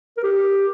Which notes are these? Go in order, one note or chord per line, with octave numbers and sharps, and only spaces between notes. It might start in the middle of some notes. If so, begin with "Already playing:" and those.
A#4
G4